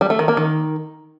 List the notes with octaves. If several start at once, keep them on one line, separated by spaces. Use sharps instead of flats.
G3
A3
D#3
A#3
D#3